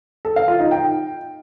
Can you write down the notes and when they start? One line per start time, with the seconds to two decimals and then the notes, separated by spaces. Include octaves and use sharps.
0.25 A4
0.36 F5
0.48 F4
0.60 D#4
0.71 G5